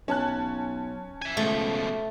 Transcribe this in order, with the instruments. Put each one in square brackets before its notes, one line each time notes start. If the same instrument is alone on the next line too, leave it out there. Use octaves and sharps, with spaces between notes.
[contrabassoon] B1 [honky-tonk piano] C#4 A5 F#6
[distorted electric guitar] E5 G#5
[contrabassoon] C#2 [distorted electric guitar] B2 F3 [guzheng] A3